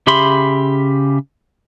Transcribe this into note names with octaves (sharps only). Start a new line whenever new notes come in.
C#3 G4 E5 B5 C6